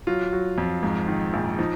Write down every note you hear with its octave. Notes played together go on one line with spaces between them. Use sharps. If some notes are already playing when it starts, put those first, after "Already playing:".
F#3 F4
F#3
F2
G#2
D#3
A#1
F3 D#4